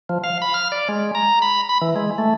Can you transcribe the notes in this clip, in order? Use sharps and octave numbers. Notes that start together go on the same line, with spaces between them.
F3
F5
B5
F6
D5
G#3
A#5
B5
B5
E3
G#3
A3